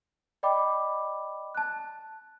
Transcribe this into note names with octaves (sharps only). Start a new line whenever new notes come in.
D5 D#5 G5 B5 D6
A5 F#6